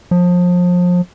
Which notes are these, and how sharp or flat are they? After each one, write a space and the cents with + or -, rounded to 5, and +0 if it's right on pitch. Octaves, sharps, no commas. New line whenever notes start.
F3 +30